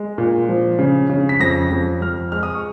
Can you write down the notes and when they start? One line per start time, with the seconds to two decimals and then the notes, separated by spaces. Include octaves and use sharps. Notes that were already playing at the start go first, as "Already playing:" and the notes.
Already playing: G#3
0.18 A#2
0.49 F3
0.79 C#3
1.10 C#3
1.29 B6
1.40 F2 A#6
1.70 F2
2.01 F2 F6
2.32 G#3 F6
2.43 D#6
2.55 C#6